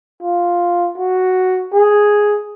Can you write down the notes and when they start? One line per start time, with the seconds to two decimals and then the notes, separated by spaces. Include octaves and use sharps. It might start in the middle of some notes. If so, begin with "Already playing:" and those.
0.22 F4
0.98 F#4
1.73 G#4